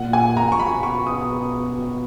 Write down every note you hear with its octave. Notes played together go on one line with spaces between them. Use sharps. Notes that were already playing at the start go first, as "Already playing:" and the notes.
Already playing: A#2 F#5
G#5
A#5
C#6
B2 B5
C#6
D#6